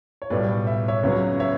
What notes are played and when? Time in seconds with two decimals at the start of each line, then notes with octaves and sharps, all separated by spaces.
0.22 C#5
0.30 B1 A2 G3 B4 D5
0.67 E5
0.88 C#5 E5
1.03 C#2 C#3 F#3 B3
1.40 C#5 E5